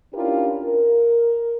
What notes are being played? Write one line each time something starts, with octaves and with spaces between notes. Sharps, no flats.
C#4 D4 E4 F4 G4 A#4
A#4